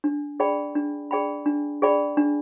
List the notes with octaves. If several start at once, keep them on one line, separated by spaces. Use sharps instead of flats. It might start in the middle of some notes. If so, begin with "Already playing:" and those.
D4
G#4 D5 G5 B5
D4
G#4 D5 G5 B5
D4
G#4 D5 G5 B5
D4